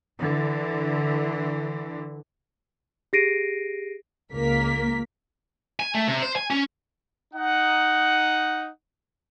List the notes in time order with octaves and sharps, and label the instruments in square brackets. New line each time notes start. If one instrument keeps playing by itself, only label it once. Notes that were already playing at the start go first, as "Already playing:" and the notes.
[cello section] D3 E3
[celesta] G4 G#4 A#6 C7 D7 D#7
[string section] C#2 A#3 A#4 B6
[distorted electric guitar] G#5
A3
C3
C5
G#5
C#4
[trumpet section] D#4 F#5